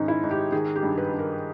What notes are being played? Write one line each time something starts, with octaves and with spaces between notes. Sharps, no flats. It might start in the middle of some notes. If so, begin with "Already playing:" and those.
Already playing: G#2 D#3 C#4 D#4
E4
G#2
G4
D#3 G#4
G4
G2
B4
G2
A#4